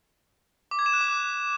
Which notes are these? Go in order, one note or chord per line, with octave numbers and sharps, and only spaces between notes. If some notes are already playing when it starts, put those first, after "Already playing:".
D6
G#6
E7
F#6
D6